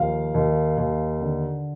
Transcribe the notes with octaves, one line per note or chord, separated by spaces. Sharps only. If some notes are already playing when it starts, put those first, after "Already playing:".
Already playing: D#2 F3 F5
D#2
D#2
D3